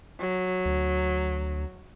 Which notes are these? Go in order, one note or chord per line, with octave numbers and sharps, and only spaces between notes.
F#3
D2